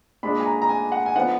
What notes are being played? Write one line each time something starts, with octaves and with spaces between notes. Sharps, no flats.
A#2 G#3 D4 B5
G#5
A#5
A#5
G#5
F#5
G#5
D3 F3 B3 D#4 F#5